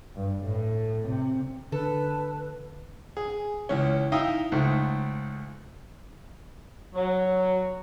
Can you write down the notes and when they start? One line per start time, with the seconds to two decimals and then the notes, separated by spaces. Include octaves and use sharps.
0.16 G2
0.46 A2
1.09 C3
1.72 D3 A4 B4
3.17 G#4
3.69 C#2 E3 C#4
4.12 D#4 E4 F5 G5 D#6
4.52 C#2 G#2 A3
6.94 F#3